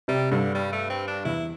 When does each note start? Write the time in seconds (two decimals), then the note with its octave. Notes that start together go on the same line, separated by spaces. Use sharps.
0.08 C3 G3
0.31 G2 D3
0.55 G3
0.73 A3
0.90 C4
1.08 D4
1.25 E2 E4